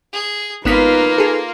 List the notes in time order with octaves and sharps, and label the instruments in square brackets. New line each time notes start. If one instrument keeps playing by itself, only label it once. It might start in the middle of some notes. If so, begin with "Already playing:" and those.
[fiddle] G#4
[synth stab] G#1 B3 B6 [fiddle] A#3 F4 [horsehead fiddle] D#4 B4
[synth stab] G#4 A4